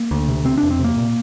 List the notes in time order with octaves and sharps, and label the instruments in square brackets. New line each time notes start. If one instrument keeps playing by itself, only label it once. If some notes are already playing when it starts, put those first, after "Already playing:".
Already playing: [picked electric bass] A#3
D2
C3
C3 C4
D4
F2
C4
C3
A#3
A#2